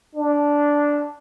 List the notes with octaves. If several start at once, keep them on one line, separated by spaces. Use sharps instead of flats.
D4